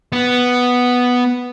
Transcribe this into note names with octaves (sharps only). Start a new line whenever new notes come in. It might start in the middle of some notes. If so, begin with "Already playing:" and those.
B3